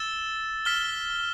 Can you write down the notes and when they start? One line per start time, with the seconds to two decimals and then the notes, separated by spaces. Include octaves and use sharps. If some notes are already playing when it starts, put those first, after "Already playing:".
Already playing: E6 A6 E7 G7
0.65 F6 B6 E7 G7